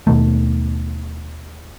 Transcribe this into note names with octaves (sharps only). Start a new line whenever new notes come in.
D#2 B2 D#3 A3